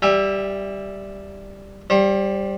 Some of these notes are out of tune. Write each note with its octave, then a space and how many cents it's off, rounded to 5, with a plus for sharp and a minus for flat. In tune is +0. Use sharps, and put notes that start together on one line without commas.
G3 +0 E5 +0 G5 +40
G3 +0 C5 +35